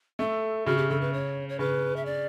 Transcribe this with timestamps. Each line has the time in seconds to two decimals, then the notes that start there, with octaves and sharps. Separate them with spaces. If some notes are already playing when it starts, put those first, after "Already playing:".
0.19 A3 A4
0.66 C#3 F#4
0.77 G4
0.89 C#3 A4
1.01 B4
1.13 C#5
1.49 C#5
1.59 C#3 B4
1.96 E5
2.06 D5